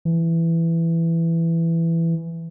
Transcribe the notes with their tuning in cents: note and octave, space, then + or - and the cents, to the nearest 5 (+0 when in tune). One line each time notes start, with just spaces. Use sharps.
E3 +10